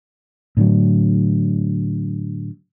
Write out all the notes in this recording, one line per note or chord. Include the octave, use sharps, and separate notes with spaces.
A2 D3 F#3